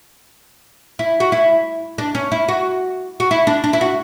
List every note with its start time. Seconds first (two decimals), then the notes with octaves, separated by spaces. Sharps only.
0.99 E4
1.20 F#4
1.32 E4
1.98 D4
2.15 C#4
2.32 E4
2.48 F#4
3.20 F#4
3.31 E4
3.47 D4
3.64 D4
3.73 E4
3.81 F#4